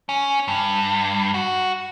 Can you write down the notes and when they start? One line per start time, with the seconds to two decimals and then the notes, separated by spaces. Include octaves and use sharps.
0.09 C#4
0.48 G2
1.34 F#4